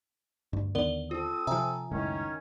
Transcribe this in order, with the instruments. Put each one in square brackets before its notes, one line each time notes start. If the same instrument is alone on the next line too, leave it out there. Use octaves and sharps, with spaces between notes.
[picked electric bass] D2 G2
[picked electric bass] D#2 D3 B3 [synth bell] A#4 D5 G7
[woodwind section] C4 A4 D#6 [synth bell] F4
[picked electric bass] C3 F3 [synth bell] E5 G#5 A#5
[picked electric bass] F#1 C#2 A2 [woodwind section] D#3 C#4